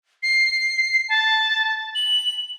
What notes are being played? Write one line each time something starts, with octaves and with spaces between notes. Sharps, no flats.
C7
A5
F#7